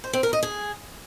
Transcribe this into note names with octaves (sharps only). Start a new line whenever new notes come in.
C5
C4
A#4
D#5
G#4